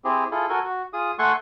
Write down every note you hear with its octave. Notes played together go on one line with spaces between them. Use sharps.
C4 E4 G4 G#4
E4 F4 G#4 A4
F#4 A4 A#4 G#5
F#4
F4 G#4 D#6
A3 A4 F#5 G#5 C6 C#6